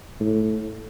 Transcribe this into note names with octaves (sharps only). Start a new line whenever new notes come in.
A2